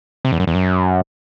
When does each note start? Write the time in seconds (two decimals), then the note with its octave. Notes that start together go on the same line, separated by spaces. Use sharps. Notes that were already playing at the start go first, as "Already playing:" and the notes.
0.25 C3
0.32 E2
0.40 F#2
0.47 E2
0.55 F#2